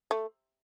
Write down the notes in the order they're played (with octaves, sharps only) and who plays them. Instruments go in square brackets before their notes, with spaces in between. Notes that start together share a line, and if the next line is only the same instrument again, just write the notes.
[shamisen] A3